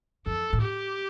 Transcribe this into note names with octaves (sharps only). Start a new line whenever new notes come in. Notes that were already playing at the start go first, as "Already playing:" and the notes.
F2 A4
A2
G4